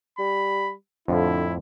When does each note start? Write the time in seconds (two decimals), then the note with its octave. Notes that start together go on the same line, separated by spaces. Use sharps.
0.19 G3 B5
1.08 F2 A2 D3 F3 E4